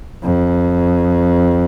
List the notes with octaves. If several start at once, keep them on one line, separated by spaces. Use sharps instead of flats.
F2